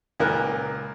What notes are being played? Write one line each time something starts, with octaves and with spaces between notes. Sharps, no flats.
C#2 A#2 A#4 F#6